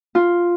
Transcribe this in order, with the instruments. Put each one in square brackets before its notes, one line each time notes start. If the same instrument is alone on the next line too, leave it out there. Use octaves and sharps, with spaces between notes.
[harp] F4